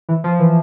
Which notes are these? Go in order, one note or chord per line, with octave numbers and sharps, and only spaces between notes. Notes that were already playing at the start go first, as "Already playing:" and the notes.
E3
F3
E3